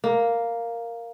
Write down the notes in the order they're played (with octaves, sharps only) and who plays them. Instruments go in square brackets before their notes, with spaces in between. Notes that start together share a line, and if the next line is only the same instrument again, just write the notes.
[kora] A#3